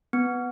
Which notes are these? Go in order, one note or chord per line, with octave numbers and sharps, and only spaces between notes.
B3